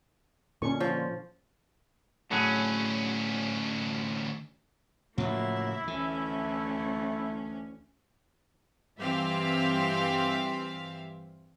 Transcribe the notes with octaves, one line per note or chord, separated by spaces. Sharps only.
A#2 D3 C#4 C#6
F3 F4 C#5
D2 A2 F#3 C#4 G#4
A2 C#3 F3 F#3 A#3 E4 E5
D2 E3 A3 C#4
G2 E3 C4 G4 E5 F5